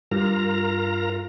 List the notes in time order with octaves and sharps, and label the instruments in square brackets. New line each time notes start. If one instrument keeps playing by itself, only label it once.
[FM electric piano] G2 [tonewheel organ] F4 A#4 A#5